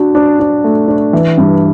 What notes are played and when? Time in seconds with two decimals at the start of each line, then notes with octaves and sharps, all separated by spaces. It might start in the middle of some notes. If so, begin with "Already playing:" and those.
Already playing: D4 F#4
0.15 D4
0.40 D4
0.64 A3
0.88 D4
1.13 E3
1.38 G2